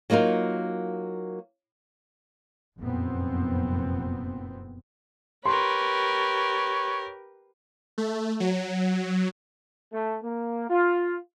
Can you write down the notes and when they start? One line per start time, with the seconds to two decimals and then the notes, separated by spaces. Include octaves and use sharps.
0.10 F#3 A#3 D#4 F4 A#4
2.78 F1 F#2 A#2 B3 C4
5.46 G4 A#4 B4 C#5 C6
7.98 A3
8.40 F#3
9.92 A3
10.23 A#3
10.70 F4